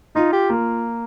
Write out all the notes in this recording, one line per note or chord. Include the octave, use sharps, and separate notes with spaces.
D#4 F4
G4
A#3